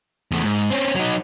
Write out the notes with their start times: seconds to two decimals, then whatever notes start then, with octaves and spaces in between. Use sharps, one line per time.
0.32 E2 A3
0.44 G#2
0.70 C4 C#4
0.95 F#3 D#4